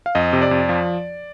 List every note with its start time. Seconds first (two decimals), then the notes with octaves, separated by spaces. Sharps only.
0.06 F5
0.15 F2 D#5
0.33 C3
0.42 D5
0.51 F2
0.69 F3